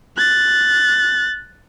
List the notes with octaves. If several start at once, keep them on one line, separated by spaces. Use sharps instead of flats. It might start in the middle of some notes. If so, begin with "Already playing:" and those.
F#6 A6